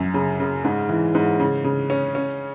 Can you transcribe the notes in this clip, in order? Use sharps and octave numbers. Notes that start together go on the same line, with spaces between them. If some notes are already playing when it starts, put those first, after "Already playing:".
Already playing: F#2
C#3
C#3
G#2
E3
G#2
C#3
C#3
C#4
C#4